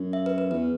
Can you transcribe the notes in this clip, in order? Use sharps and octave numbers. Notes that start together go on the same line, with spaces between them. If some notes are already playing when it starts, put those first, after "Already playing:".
Already playing: F#2
E5
B4
B4
E2 B4